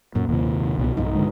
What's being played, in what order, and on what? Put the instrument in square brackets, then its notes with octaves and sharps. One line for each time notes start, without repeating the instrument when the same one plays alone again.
[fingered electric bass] F#2 [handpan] A#2
[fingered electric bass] D#2 C3
C2 B2
[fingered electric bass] B1 G2 [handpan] D#4
[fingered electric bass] D3 G#3